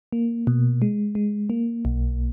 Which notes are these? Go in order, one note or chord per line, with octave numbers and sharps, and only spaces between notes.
A#3
B2
G#3
G#3
A#3
B1